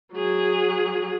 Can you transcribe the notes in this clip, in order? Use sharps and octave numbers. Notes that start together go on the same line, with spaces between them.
F#3 G#4